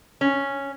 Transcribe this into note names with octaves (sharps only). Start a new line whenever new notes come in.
C#4